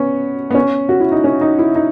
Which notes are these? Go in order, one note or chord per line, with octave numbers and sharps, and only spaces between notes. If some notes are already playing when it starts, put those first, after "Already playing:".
Already playing: B3 C#4
B3
C#4
F#4
E4
D#4
C#4
D#4
E4
D#4